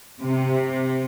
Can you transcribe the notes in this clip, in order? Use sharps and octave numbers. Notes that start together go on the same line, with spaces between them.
C3